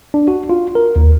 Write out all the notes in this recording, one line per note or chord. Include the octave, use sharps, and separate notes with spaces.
D4
F#4
F4
A#4
D#2